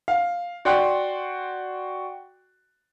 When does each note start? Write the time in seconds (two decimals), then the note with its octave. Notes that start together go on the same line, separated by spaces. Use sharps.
0.08 F5
0.65 F#4 D5 G5 C6 F#6